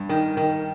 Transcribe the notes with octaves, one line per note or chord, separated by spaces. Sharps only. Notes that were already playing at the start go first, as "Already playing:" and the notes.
Already playing: G2
D#3
D#3